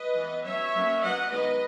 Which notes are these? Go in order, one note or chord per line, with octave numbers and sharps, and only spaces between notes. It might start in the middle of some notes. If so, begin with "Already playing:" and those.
Already playing: B4 D#5
E3 B3
F#3 C#4 C#5 E5
F#3 A#3 C#4
F#3 B3 D#5 F#5
D#3 G#3 B3 B4 D#5